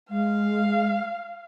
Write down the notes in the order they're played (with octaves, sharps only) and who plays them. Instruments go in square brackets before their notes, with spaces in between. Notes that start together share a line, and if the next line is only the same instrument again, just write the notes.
[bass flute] G#3 [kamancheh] F5